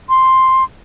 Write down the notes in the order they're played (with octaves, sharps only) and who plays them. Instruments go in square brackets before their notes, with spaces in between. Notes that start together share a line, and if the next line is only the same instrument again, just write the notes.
[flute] C6